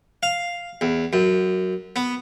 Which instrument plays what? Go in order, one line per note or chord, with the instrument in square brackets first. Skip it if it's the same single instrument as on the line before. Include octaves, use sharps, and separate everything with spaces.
[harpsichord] F5
E2
F#2
B3